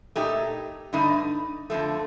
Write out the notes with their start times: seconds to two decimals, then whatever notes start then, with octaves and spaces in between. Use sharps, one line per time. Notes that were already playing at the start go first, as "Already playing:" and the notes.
0.16 A#2 A3 D#4 G4
0.93 G2 D3 A3 D#4
1.70 F2 D3 F3 A3